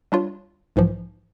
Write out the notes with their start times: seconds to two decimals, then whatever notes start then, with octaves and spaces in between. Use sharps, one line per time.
0.12 G3 D4 F4 C#5
0.76 B1 G#2 E3 F3